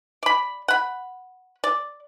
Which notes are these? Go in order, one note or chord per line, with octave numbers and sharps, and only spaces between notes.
D5 B5
F#5 B5
D5